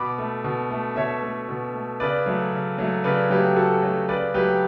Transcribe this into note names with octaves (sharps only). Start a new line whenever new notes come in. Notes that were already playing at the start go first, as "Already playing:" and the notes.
Already playing: B2 B5 D6
A3
B2
A3
B2 C#5 E5
A3
B2
A3
C#3 B4 D5
F#3 A3
C#3
F#3 A3
C#3 B4 D5
F#3 A3 G4 B4
C#3 F#4 A4
F#3 A3 F#4
C#3 B4 D5
F#3 A3 G4 B4